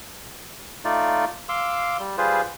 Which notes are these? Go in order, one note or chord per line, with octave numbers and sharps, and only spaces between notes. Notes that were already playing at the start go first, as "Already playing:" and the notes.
A3 D#4 F4 D5
F5 C6 D6 E6
G3
G3 F4 G#4 B4 C5